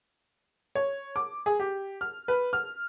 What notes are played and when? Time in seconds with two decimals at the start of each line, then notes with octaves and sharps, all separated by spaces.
0.75 C#5
1.16 D6
1.46 G#4
1.60 G4
2.01 F6
2.28 B4
2.53 F6